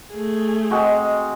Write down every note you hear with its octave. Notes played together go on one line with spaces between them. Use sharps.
A3 G#4
G#3 C4 F#4